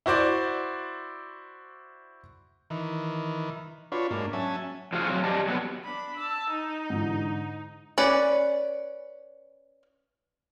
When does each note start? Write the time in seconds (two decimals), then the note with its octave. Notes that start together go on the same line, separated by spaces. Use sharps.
0.06 E4 F#4 C5 D5
2.70 D#3 E3
3.92 D4 F4 F#4 B4 C#5
4.11 G#2 A#3 D4
4.33 F#3 C#4 E5 G#5 A5
4.93 A2 F3 F#4 G#4 F5
5.08 F#3 C4
5.24 G4 D5 D#5 A5
5.48 F#3 B3 B4
5.85 D4 B5
6.17 A5 E6
6.50 D#4
6.90 G#2 D3 E3
7.98 C#4 B4 D5